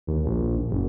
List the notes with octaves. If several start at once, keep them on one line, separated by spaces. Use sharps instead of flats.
D#2
A#1
F#1